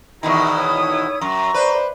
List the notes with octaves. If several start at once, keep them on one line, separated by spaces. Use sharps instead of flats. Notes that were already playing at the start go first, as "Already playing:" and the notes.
E2 B2 D#3 D#4 E4 E5 A#5 C#6
C#5 D#6
F#2 A#5 C#6
B4 C5 D5